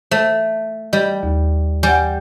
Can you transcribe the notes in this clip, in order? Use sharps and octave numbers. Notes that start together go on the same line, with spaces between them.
A3 C5
G3 D#5
D#2
G3 F#5 G#5